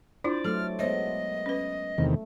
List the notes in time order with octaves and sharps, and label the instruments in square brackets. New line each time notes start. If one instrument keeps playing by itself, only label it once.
[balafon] D4 E4 F4 [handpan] C5 D5
[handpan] F#3 A3 [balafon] A4 [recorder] F6
[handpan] G#3 B3 [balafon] C5 C#5 E5 [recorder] D#5
[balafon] C#4 B4
[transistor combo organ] E2 C3 D#3 [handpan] A3